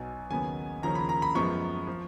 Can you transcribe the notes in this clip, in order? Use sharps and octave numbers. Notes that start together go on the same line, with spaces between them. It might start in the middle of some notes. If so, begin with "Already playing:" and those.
Already playing: B1 B2 F#3 G#5
D#2 C#3 F#3 B3 G#5
D#2 C#3 F3 A#3 C#4 A#5
B5
A#5
B5
F#2 F3 G#3 B3 C#6
F3